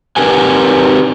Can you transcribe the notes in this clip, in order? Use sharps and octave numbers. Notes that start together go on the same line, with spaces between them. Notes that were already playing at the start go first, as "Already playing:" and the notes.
C4 D#4 G4 A#4 B4 G#5